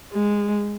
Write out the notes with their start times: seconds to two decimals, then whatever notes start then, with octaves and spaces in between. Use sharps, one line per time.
0.13 G#3